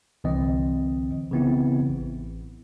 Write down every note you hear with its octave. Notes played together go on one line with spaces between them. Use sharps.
C2 D3 E3 C4 D#5
C#3 E3 B3 C4 E4
A1